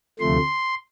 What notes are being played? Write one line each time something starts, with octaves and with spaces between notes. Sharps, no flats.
D2 C3 F3 A3 C6